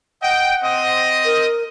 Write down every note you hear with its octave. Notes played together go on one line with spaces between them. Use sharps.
D#5 F#5 G5
C4 D#5
A#4